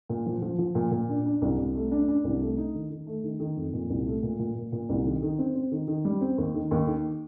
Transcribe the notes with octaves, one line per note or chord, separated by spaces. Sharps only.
A#2
F3
F3
F3
A#2
A#2
D4
D4
C2
C2
A3
D4
D4
C2
A3
D#4
D#3
D#3
A3
D#3
D#3
F2
A#2
C2
A3
A#2
A#2
A#2
A#2
C2
D#3
D#3
C4
C4
D#3
D#3
G3
C4
D#2
D#3
D#2
D#3